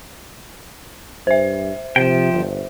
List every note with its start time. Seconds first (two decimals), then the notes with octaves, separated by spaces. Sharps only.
1.27 G2 C5 E5
1.96 C3 F3 G5
2.34 G1